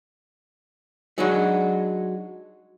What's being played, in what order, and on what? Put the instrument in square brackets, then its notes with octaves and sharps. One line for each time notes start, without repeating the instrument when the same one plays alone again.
[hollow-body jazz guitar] F#3 G#3 D4 D#4 F#4